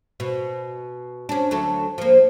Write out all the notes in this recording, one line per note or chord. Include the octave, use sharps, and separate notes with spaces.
B2
C#4 D4
D2 F#3 A4
F3 A#3